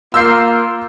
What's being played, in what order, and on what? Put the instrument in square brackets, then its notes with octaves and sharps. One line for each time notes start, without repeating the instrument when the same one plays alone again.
[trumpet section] A#3 F4 [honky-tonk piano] E6 G6 C7